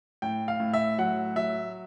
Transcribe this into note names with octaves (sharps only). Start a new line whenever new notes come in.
A2 G5
F5
A2
E5
F#3 F#5
F#3 E5